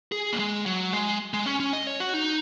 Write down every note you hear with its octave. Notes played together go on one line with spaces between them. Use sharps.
G#4
A#3
G#3
F#3
G#3
G#3
C#4
C#4
D#5
C#5
F#4
D#4